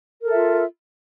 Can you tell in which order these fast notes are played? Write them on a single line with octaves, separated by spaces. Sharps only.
A#4 A4 E5 F4